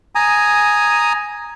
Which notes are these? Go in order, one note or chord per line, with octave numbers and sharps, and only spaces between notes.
G#5 A#5 D#6